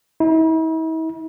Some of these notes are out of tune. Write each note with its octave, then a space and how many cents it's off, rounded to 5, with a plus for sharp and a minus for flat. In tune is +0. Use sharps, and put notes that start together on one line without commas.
E4 -45